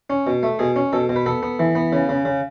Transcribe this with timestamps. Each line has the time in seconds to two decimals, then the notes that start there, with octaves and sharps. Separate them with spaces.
0.10 C#4
0.27 B2
0.43 A3
0.59 B2 G#4
0.76 C#4
0.93 B2 A4
1.09 B2
1.16 B4
1.26 B3 A4
1.43 B3
1.59 E3
1.75 B3
1.93 C#3
2.09 C#3
2.25 C#3